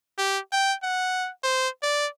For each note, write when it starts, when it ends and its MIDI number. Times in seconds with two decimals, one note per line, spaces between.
0.18 0.39 67
0.52 0.75 79
0.83 1.30 78
1.44 1.69 72
1.82 2.07 74